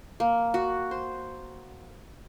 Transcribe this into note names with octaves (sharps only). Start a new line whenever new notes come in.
A#3
F#4
C5